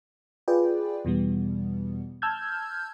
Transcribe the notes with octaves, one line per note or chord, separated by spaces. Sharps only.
F4 G#4 B4 D5 G5
E2 B2 E3 G3 B3
A5 E6 F6 G6 G#6